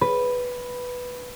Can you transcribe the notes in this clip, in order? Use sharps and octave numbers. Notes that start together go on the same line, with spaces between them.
B4